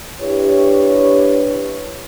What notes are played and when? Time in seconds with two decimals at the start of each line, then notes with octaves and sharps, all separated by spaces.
0.21 D4 E4 G4 B4 C#5